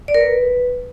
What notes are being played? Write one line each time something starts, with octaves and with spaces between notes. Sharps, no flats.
D5
A#4
B4